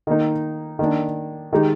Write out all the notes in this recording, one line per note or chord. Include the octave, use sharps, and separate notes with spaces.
D#3 A#3 D#4
D#3 A#3 D4
D#3 G#3 D#4 G4